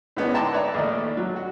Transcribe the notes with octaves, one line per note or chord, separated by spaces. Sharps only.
A2 G#3 B3 C#4 D4
E5 G5 A5 A#5 C6 D6
B4 C#5 D5 E5 A#5
A#1 D#2 A3 D5
F#3
F#4